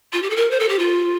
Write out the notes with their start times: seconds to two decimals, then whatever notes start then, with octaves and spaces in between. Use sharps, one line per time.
0.13 F4
0.22 G4
0.30 A4
0.36 A#4
0.51 C5
0.60 A4
0.69 G4
0.79 F4